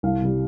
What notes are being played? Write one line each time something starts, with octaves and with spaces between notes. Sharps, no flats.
C2 F5
C3 G3